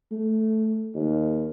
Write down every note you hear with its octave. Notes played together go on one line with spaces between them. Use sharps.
A3
D#2